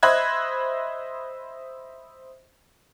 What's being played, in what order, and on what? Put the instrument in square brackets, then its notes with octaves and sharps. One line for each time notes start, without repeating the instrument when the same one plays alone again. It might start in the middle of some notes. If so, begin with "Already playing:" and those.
[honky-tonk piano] C5 D#5 E5 B5 F#6 G#6